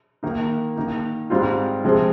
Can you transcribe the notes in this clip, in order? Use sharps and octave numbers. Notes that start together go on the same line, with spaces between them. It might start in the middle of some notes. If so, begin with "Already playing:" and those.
D#3 A#3 D#4
D#3 A#3 D#4
G#2 G3 C4 F4
C3 F3 G#3 C4